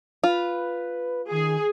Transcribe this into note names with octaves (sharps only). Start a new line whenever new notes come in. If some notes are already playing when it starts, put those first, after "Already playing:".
F4 B4
D#3 G#4